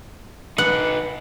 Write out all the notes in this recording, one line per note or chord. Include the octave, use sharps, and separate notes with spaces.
D#4 B4 F#5